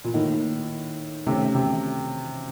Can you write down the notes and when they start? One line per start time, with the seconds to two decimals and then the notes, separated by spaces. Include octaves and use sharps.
0.04 A#2
0.14 A2 D#3 A#3 D#4
1.27 C3 D#3 A3 C#4
1.55 C3